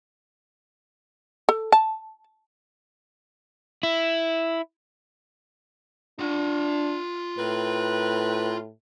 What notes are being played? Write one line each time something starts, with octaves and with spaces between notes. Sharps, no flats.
A4
A5
E4
D4 F4 F#5
A2 C4 A#4 B4